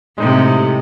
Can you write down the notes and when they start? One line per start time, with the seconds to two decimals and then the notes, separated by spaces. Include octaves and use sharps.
0.18 A2 C3 G#3 D#4 G5